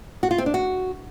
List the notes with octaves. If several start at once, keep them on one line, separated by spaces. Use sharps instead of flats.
F#4
F4
C4
D4
F#4